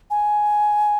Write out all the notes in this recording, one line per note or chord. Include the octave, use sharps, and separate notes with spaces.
G#5